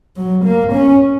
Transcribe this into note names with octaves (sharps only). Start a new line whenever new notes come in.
F#3
A#3
C#4